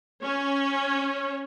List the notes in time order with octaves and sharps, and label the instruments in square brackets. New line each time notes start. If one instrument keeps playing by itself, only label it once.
[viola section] C#4 C#5